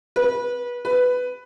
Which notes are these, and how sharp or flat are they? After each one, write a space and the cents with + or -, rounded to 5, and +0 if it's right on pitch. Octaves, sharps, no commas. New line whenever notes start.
B4 -25
B4 +10